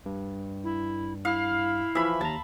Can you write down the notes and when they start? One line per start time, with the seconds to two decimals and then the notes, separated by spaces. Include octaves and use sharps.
0.06 G2
0.64 E4
1.25 E4 F5
1.95 E3 F3 E5 B5
2.21 D#2 A5 A#5